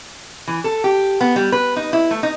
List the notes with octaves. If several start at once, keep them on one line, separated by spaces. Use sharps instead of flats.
E3
A4
G4
B3
G3
B4
D#4
E4
A3
D#4